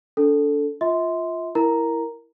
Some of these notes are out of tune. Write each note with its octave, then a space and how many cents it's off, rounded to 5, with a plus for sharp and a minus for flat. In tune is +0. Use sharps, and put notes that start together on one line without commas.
D4 -30 A4 +0
F4 +0 E5 -40 C6 -10
E4 +0 A#4 +0 A#5 +0